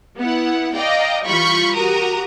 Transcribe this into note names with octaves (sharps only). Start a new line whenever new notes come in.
B3 E4 F#5
D5 D#5 F5 G5 A#5
E3 G3 F4 B5 C#6 G6
F#4 G4 A#4 A#5 D#6